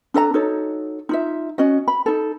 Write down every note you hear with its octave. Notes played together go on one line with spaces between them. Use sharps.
D4 A4 D#5 A#5
D#4 F#4 A4 C#5
D#4 F4 E5
C#4 F#4 D#5
B5
D#4 A4